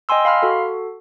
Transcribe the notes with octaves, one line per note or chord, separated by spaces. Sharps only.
D#5 G5 G#5 C6 E6
F5 B5 C6 F6
F#4 A4